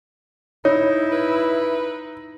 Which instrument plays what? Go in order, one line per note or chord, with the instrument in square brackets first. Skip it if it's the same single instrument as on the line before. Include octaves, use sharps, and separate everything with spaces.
[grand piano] D#4 [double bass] E4 [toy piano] C#5
[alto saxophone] B4